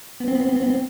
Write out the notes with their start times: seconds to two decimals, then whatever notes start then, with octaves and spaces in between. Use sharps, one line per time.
0.20 B3
0.28 C4
0.35 B3
0.41 C4
0.49 B3
0.56 C4
0.63 B3
0.70 C4